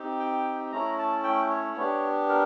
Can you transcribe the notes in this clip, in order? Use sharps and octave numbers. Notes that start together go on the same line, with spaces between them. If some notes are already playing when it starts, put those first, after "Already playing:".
Already playing: C4 D#4 G4
G5
A3 C#4 E4 A#5
A5
G5
C#5
B3 D4 G4
A#4